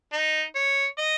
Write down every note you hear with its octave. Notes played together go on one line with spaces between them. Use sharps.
D#4
C#5
D#5